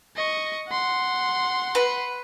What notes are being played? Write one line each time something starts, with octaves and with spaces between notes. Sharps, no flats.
D#5 C#6
F#5 C6
B4